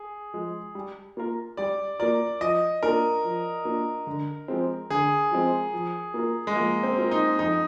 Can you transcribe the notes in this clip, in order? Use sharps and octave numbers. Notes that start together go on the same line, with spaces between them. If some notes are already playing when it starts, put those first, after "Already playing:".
Already playing: G#4
F3 G#3
G3
A#3 F4 A#4
G3 D5
A#3 F4 A#4 D5
F3 D#5
A#3 D4 F4 A#4
F3
A#3 D4 F4
D3
F3 G#3 C4
D3 G#4
F3 G#3 C4
F3
A#3 F4 A#4
G#3
F3 A#3
C4
A#3 F4 A#4
D#4
F2 D#4